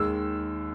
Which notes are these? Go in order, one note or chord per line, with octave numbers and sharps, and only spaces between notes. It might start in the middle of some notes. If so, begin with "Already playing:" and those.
Already playing: D#2 D#3 G#3 E6